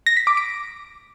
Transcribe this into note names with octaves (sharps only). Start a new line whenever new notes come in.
A#6
B6
D6
D7